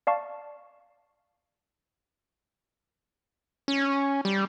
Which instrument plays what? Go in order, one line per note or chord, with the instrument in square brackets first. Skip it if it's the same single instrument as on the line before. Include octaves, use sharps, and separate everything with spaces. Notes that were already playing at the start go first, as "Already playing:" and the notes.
[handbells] D5 F5 A5 C#6
[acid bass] C#4
G3